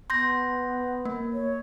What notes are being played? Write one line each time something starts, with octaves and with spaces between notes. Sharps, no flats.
B3 C6 G6 A#6
A#3
C#5